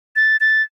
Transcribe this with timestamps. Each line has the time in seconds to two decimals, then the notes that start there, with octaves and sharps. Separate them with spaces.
0.16 A6
0.41 A6